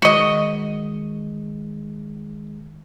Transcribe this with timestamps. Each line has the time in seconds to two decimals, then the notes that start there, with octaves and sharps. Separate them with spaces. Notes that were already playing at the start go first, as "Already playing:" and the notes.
0.02 D#3 G#3 F#4 D#5